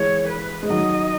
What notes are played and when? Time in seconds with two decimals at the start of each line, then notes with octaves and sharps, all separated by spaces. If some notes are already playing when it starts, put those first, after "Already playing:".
Already playing: E3 G#3 C#5
0.29 B4
0.63 G#3
0.70 D#3 F#3 D#5